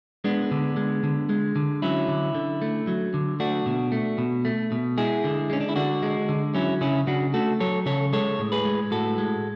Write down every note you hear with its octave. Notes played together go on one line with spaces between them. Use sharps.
G#3 B3 D4
D3
G#3
D3
G#3
D3
F#3 C#4 E4
D3
D3
A3
F#3
D3
A3 D4 F#4
B2
A3
B2
A3
B2
G#3 E4 G#4
D3
G#3 C#4
D4
E4
D3 D4 F#4
G#3
D3
F#3 C#4 E4
C#3 C#4 E4
C#3 D4 F#4
A3 F#4 A4
F#3 A4 C#5
C#3 A4 C#5
G#3 A4 C#5
A2
G#4 B4
G#3
A2 F#4 A4
G#3